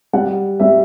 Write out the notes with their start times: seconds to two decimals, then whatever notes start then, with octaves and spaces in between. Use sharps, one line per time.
0.13 G3 F#5
0.60 G3 E5